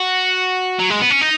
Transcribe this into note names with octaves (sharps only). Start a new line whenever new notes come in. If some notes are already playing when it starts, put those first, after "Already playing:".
Already playing: F#4
F#3
G#3
B3
C#4
D#4